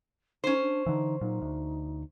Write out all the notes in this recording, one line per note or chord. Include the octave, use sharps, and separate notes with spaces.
C#4 D#4 C5
D4
D3 E3 D#4
A#2 F#3 D#4
D2